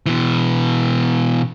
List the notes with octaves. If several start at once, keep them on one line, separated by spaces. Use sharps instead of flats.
B2 E3